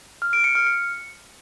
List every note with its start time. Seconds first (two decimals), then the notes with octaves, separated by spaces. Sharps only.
0.22 F6
0.33 D7
0.44 C#7
0.55 F6
0.66 C#7